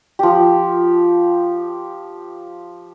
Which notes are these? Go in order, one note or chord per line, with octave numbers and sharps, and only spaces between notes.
F3 G4